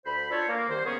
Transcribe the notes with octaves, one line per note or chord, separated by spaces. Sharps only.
D2 C5 B5
D4 F4 A4 C5 C#5
A#3
C2 D#3 C5
A#3 B3 C#4 G#4